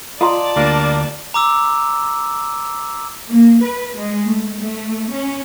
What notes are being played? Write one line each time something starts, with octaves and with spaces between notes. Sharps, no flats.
F4 D5 D#5 F5 A5 A#5 C6
D2 G3 A#3 D4
A#5 D6 E6
A#3
B4
G#3
A3
A3
C#4